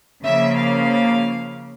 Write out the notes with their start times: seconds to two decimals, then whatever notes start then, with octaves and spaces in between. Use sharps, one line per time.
0.24 C#3 F3 A#3 E5
0.58 F5